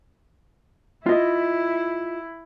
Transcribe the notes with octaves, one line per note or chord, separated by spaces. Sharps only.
E4 F4 D#5